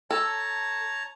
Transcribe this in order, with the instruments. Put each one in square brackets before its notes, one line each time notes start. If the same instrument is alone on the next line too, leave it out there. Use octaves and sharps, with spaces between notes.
[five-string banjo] A4 [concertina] C#5 A5 A#5